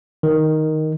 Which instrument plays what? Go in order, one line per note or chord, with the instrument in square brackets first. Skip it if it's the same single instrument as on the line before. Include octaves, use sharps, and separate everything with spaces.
[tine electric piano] D#3